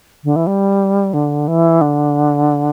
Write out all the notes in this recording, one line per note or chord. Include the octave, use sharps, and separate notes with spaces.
D3
E3
G3
D3
E3
D3